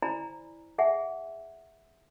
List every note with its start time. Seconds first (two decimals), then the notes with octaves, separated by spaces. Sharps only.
0.02 E4 C5 D5 G#5 A#5 B5
0.78 G#4 E5 F#5 G#5